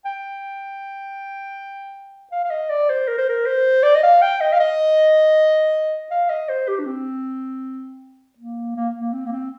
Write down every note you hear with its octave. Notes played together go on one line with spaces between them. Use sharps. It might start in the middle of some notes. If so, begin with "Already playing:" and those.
G5
F5
F5
D#5
D5
C5
A#4
C5
A#4
C5
D5
D#5
F5
G5
D#5
F5
D#5
F5
D#5
C5
G4
D4
C4
A#3
A#3
A#3
C4
A#3
C4